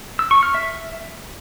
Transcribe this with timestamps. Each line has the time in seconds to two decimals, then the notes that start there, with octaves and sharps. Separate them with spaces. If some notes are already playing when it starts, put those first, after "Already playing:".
0.19 E6
0.31 C#6
0.43 F6
0.54 E5